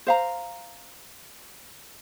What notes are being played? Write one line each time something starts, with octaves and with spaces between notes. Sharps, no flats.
C5 F5 A#5